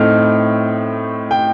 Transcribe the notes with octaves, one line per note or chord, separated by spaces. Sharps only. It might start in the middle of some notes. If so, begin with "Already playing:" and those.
Already playing: A2 A3 C4 D#4 F6
G5